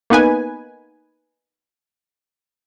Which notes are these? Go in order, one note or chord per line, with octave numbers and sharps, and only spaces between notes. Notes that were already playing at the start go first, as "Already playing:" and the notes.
A#3 B3 D#4 B4 G#5